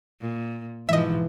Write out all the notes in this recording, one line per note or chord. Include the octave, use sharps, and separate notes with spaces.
A#2
G#2 B2 E3 F3 D#5 E5